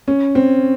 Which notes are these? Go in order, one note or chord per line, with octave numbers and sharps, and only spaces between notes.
C#4
C4